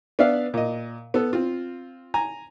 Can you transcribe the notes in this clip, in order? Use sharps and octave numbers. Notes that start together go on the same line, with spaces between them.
B3 D4 D5 E5 F5
A#2 D#5
B3 A4
C4 F4
G#5 A#5